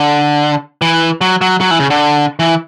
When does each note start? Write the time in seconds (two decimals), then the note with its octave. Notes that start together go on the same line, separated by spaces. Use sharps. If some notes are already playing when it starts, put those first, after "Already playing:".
Already playing: D3
0.82 E3
1.21 F#3
1.41 F#3
1.60 F#3
1.71 E3
1.80 C#3
1.90 D3
2.39 E3